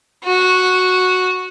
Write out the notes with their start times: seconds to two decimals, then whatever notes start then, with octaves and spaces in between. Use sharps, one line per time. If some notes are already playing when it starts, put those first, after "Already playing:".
0.24 F#4